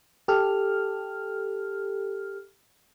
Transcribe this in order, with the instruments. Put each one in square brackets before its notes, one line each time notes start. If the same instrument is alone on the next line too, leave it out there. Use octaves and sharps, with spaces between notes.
[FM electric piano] G4 A4 F6